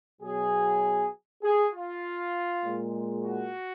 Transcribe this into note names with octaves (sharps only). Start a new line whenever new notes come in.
B2 F#3 G#4
G#4
F4
A#2 G#3
F#4